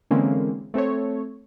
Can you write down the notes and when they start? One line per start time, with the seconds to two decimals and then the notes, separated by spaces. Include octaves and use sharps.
0.11 D3 E3 G#3 A#3 C4 C#4
0.74 A3 C4 A4 C#5